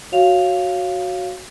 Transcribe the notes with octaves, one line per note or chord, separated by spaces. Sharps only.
F#4 C#5 F5 F7